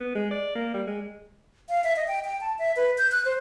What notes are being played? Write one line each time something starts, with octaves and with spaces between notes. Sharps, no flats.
B3
G#3
D5
A#3
G3
G#3
F5
E5
D#5
G5
G5
A5
E5
B4
G6
F#6
C5